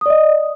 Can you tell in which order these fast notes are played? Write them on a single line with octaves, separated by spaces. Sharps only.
D#6 D5 D#5